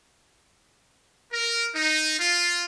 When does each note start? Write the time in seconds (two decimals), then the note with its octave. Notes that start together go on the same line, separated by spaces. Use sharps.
1.33 A#4
1.75 D#4
2.20 F4